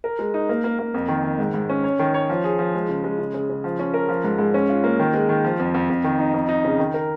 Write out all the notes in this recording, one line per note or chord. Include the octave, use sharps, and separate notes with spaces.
A#4
G#3
D#4
A#3
A#3
A#3
F2
D#3
D#3
G#2
G#2
C#4
C#5
D#3
C#5
F3
G#4
F3
G#3
C#3
G#3
C#3
C#3
C#3
F3
C#4
A#4
F3
G#2
G#2
C#4
F4
A#3
D#3
G#3
D#3
F3
F2
F2
F2
D#3
D#4
F2
D#4
C#3
D#3
A#4